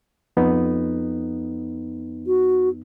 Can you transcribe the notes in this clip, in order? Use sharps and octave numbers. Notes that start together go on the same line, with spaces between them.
F2 B3 D#4
F#4